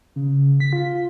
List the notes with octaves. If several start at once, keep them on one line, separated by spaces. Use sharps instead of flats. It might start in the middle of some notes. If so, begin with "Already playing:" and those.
C#3
B6
F4